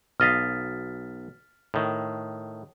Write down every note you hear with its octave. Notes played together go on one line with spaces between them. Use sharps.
B1 D#5 F5 F6 A6 B6
A2 D#3